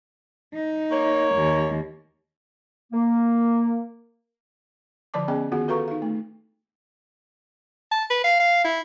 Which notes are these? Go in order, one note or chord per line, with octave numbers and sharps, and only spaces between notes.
D#4
A#3 C#5
D#2
A#3
D3 F3 D5 A5 D6
B3 C#4 G#4 D#5 G5
D#3 B3 F4 F#4 G#4 F#5
F#4 A4 B4 F5 A#5 C#6
D#4 F5
A3
A5
B4
F5
F5
E4